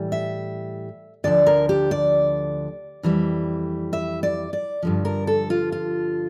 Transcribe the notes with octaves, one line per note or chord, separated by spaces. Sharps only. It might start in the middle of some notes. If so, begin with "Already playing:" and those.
Already playing: A2 E3 G3
E5
D2 D3 F3 D5
A#4
G4
D5
F2 E3 G3
E5
D5
D5
G2 D3 F3
A#4
A4
F4
F4